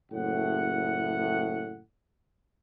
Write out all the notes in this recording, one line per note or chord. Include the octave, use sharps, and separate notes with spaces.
F#1 A2 F#5